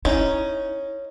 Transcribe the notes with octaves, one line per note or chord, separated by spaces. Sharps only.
C#4 D#4 E4